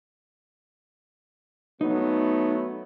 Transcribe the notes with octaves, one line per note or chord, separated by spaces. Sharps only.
F#3 A3 B3 D#4